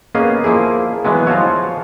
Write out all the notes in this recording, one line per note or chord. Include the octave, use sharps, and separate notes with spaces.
A#3 B3 C#4 G#4 D#5 F5
F3 A#3 E4 G#4
E3 F#3 G#3 B3
F3 F4 F#4 C#5